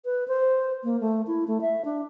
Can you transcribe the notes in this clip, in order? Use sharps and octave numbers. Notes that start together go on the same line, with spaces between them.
B4
C5
A#3
A3
E4
A3
E5
D4